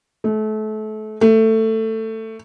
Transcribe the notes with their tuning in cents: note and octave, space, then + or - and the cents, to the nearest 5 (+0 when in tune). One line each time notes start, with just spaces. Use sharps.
A3 -30
A3 +15